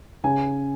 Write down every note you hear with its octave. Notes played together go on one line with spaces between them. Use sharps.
C#3 G#5